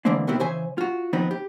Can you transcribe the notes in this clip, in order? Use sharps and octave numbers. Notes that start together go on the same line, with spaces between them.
D3 E3 G#3 A#3 C4 D4
B2 D#3 B3 C4 E4 G4
C#3 E3 C5 E5 G#5
F4 F#4
D#3 F3 B3 C4 D#4 B4
G4